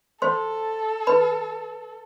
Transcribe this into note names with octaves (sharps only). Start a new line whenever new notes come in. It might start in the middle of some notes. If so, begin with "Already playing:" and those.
A4 C5 C6
B4 B5